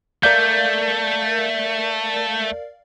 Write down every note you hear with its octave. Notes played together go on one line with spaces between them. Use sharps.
A3 A#4 D5 F5 G6